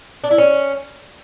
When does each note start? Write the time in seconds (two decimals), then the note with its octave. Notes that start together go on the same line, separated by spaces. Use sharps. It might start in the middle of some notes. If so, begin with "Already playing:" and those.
0.24 D4
0.31 E4
0.38 C#4